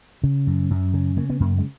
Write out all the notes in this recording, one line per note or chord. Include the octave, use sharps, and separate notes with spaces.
C#3
F#2
F#2
C#3
C#3 A#3
B3
F#2 A#3
G#3